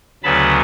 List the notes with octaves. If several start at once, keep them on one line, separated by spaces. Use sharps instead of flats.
D2 C#3 F#3 B3 A5 B5